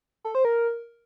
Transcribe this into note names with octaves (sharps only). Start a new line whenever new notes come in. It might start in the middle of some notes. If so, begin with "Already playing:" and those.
A4
C5
A#4